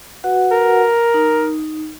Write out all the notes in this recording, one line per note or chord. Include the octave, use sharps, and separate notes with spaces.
F#4 B4 F#5
A#4
D#4